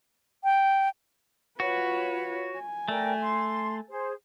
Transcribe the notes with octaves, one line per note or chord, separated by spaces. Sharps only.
G5
F4 F#4 B4 C#5
G#5
A3 A#4 D5 G5
C6
G#4 C5